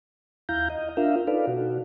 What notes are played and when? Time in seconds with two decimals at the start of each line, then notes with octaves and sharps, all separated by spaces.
0.49 D#2 E4 F5 A#5 G6
0.70 D#5
0.97 D4 F4 A#4 E5 F5
1.27 D#4 A4 B4 D5 F5
1.47 B2 F#4